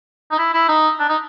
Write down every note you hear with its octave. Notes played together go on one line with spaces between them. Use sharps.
D#4
E4
E4
D#4
D4
D#4